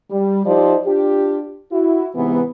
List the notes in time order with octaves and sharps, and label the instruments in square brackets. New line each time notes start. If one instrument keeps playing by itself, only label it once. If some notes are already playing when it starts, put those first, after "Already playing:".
[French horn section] G3
F3 D#4 G4 C5 D5
D4 F4 G4
E4 F#4
G#2 C3 E3 B3